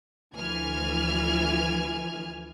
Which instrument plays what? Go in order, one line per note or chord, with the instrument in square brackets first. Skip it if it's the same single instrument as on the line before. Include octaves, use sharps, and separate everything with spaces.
[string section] D2 E3 F3 G#5 F6 G#6